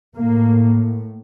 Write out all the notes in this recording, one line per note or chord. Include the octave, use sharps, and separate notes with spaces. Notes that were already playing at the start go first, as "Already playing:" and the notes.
A2 A#3